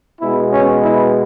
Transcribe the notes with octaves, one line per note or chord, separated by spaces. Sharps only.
B2 G#3 B3 E4
C#4
E4